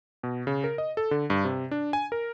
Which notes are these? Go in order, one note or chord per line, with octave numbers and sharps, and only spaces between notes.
B2
C#3
A#4
D#5
A4
D3
G2
C3
D4
G#5
A#4